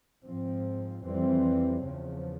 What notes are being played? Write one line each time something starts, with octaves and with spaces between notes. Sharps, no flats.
G#2 F3 C4
F2 E3 G3 C4
E2 C#3 F3